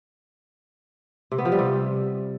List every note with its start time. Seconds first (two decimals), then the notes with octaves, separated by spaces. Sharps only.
1.32 C3
1.38 B3
1.45 F3
1.52 G3
1.59 C3